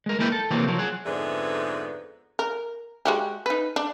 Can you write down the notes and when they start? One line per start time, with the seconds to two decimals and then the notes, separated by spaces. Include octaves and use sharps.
0.06 G#3 A#4
0.19 G#3 A#3 E4 A#4 B4 G5
0.32 A4
0.51 C3 E3 F#3 A#3 C4
0.67 F3 F#3
0.79 G#4 F#5
1.06 F2 G#2 D3 B3 G#4 E5
2.39 A#4
3.05 G#3 F#4 G4
3.46 D#4 B4
3.76 D4